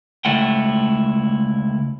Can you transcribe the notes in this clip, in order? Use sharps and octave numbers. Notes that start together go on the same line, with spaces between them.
C#2 A3 E4 F#5 G5